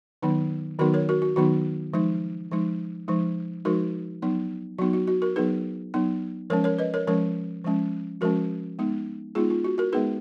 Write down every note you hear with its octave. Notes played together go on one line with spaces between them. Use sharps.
D#3 F#3 B3 D#4
D#3 F#3 B3 D#4 F#4 A#4
A#4 C#5
F#4 A#4
F#4
D#3 F#3 B3 D#4 F#4
F3 G#3 D#4
F3 G#3 D#4
F3 G#3 D#4
F3 G#3 D#4 F#4 A#4
F#3 B3 D#4
F#3 B3 D#4 F#4
F#4
F#4
F#4 A#4
F#3 B3 D#4 G#4 B4
F#3 B3 D#4
F3 G#3 C#4 A#4 C#5
A#4 C#5
B4 D#5
A#4 C#5
F3 G#3 C#4 A#4 C#5
F3 G#3 C#4
F3 G#3 C#4 F#4 A#4
G#3 B3 D#4
G#3 B3 D#4 F4 G#4
F4
F#4
F#4 A#4
G#3 B3 D#4 G#4 B4